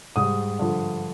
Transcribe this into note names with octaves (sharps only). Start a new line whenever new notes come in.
G#2 G3 D#6
G2 D3 F3